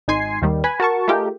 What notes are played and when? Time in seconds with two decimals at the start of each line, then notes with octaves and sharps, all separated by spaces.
0.08 G#1 D#4 G#5 C6 C7
0.42 D#2 D#3 G3
0.64 B4 G#5 B5
0.80 F#4 A#4 A5 C#6
1.08 A3 D#4 F4 G4 G#4 A#4